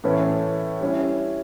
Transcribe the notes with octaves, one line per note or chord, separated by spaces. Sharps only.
A2 E3 A3 C#4 E4
G3 C#4 E4